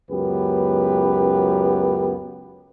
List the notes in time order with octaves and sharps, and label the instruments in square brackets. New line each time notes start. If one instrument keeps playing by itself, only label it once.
[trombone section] C#2 F#2 B3 G4 B4